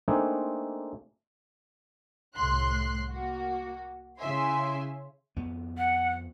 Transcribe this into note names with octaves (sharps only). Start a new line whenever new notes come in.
A3 A#3 C4 D4 D#4 G#4
C2 A2 C6 F#6
A#3 F#4
C#3 E4 E5 G#5 C6
F2 B3
F#5